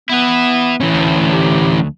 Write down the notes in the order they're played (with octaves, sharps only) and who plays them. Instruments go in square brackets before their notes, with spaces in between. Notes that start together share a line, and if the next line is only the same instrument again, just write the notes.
[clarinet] B3 [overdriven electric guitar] E4 B4
[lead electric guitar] E3 C#4
[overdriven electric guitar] D2
[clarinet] G4